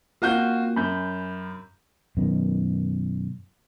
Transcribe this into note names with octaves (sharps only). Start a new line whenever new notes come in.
A#3 C4 F4 F#4 G6
F#2 B5 G6
F#2 B2 D#3